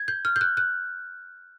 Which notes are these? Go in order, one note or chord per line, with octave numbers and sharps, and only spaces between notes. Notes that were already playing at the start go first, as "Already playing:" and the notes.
Already playing: G#6
G6
F6
G6
F#6
F#6